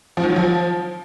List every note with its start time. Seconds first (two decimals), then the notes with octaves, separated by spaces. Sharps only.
0.17 F3
0.23 D#3
0.30 F#3
0.36 F3